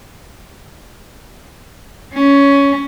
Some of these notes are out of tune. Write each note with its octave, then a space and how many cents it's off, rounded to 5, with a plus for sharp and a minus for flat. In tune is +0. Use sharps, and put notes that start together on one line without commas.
C#4 +15